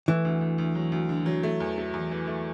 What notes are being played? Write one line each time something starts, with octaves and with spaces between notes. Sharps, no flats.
E3 A3
D2
D2
D2
F#3
D2
D3
F#3
A3
E2
A3
E2
E3
A3